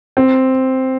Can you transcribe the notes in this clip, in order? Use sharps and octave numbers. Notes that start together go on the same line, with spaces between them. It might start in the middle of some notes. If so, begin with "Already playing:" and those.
C4